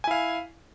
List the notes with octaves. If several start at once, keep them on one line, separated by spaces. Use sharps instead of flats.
E4 F5 G#5